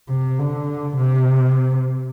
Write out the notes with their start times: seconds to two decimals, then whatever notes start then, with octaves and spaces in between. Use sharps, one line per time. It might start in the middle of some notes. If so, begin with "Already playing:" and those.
0.08 C3
0.39 D3
0.96 C3